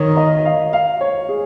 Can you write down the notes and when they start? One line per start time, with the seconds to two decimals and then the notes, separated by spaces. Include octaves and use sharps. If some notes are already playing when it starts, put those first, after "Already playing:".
Already playing: D#3 A#4 C#5
0.17 D#5
0.45 F5
0.73 F5
1.01 C#5
1.29 G#4